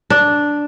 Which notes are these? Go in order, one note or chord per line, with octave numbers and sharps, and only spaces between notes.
D4